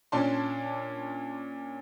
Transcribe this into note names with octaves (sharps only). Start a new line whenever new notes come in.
A#2 C#4 D4 D5 A5 C6